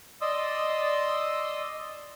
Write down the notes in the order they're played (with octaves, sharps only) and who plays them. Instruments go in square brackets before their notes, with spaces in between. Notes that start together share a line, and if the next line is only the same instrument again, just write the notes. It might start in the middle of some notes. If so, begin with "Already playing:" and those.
[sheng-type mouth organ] D5 D#5 C6 D#6 E6